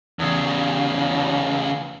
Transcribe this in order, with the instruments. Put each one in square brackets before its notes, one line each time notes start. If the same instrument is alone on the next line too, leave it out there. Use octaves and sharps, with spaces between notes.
[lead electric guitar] E2 C#3